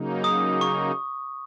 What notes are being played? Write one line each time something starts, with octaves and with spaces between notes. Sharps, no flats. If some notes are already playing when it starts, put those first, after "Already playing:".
Already playing: C#3 F#3 A#3 D#4
D#6
C#6